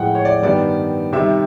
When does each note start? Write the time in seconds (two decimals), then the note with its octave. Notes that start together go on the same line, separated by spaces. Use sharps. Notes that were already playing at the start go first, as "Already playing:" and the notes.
Already playing: A2 F3 G#3 F#5 G5
0.15 C#5
0.25 D5
0.42 G2 D#3 G3 B3 D5
1.13 C3 D#3 G3 E5